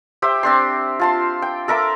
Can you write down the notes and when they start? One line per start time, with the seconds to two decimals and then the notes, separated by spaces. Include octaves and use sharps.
0.22 G4 C5 E5 G5
0.43 C4 D4 C6
0.99 F4 A5 C6
1.42 G5
1.68 A4 A#4 E5 D6